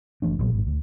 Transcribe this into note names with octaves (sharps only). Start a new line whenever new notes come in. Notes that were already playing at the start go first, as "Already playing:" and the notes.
F#1 E3 A3 D4
A#1 A#2 F#3
G#1 G#2
D2